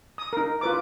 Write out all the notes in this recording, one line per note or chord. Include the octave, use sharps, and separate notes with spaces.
D#6
D#4 A#4
F4 B4 D6